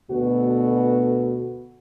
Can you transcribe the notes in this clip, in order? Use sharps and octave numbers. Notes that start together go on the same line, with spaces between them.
D2 B2 B3 F#4 A4 B4